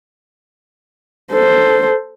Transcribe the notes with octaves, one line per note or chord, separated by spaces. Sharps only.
A4 C5